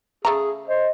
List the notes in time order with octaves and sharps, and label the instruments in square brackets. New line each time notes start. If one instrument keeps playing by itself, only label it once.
[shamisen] C#3 A3 A#5 [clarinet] G#4
[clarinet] C5 [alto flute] D#5